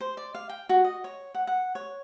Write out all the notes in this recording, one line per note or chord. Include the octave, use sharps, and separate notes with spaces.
C5
D5
F5
G5
F#4
D#5
C#5
F#5
F#5
C#5